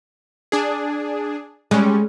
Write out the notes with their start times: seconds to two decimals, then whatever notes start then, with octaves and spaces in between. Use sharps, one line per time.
0.52 D4 G#4
1.71 G3 G#3 C#4